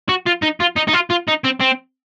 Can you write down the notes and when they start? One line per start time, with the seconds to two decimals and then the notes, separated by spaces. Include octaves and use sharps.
0.09 F#4
0.26 F4
0.42 D#4
0.60 F4
0.76 D#4
0.88 D#4
0.93 F4
1.10 F4
1.28 D#4
1.44 C4
1.60 C4